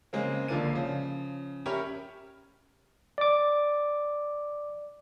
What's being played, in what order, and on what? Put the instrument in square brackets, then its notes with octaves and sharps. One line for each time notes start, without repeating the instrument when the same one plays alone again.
[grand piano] C#3 G#3 A#3 C4
A#1 D3 F3 A#3 D5 D#7
C#3 F3
C#4 G4 A#4 C#5 E5 B5
[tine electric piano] D5 D6